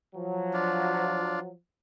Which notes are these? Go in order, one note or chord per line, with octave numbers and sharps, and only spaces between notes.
F3 F#3
D4 F4